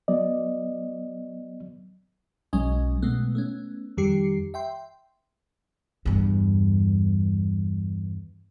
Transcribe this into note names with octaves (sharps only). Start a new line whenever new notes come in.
F#3 B3 D5 D#5
B1 F#3 G#3 C#4 D#5 G#5
B2 G#3 A3 B3
A3 B3 C#4
F2 D#3 G3 G4 C7 C#7
E5 G5 C6
E2 G2